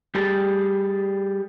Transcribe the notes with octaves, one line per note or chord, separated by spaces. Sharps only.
G3 G4 G#4 A5